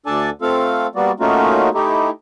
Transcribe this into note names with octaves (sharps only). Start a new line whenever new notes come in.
D2 D4 A4 D5 G#5 A5
A3 C4 F4 A4 F5
G3 A#3 B3 F#4 D5
A3 A#3 C#4 D#4 F4 F#4
A3 D#4 E4 G4